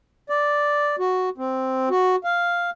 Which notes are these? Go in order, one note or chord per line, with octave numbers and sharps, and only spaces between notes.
D5
F#4
C4
F#4
F5